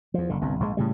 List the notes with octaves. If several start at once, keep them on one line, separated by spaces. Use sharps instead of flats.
E2 F3
F#1 D3
G1 C2 G2
A#1 G#2 D3 G#3
A2 C#3 G3